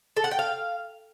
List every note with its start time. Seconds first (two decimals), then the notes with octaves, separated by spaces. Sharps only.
0.17 A4
0.24 F#5
0.31 G5
0.39 F5